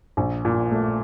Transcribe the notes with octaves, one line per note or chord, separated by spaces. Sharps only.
A#1
A#2
A3